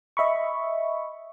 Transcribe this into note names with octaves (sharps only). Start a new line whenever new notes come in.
D#5 E5 B5 C#6